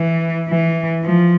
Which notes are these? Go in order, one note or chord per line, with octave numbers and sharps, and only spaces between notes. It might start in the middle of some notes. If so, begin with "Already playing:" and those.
Already playing: E3
E3
F3